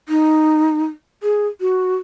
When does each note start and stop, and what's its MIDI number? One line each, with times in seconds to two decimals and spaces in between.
0.09 0.85 63
1.23 1.47 68
1.61 1.95 66